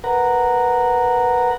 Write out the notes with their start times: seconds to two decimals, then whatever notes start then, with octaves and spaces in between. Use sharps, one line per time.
0.04 A#4 B4 F#5 A#5